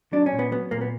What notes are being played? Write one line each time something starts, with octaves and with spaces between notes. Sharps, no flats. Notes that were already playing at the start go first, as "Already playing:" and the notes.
F#3 D4
C#4
A#2
B3
F#3 B3
A#2 A#3
B3